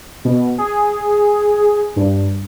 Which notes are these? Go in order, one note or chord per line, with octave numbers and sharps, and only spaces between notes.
B2
G#4
G2